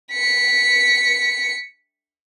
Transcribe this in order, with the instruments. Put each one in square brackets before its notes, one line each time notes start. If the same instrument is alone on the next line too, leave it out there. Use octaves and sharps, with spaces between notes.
[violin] B6 C#7